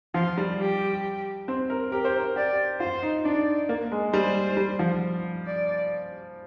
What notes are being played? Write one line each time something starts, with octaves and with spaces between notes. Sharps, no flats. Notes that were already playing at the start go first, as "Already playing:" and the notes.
F3 F4
G3
G4
C4
A#4
G4 A#4
C5
A#4
G4 D5
F4 C5
D#4
D4 D5
A#3
G#3
G3 C5
G3
F3
D5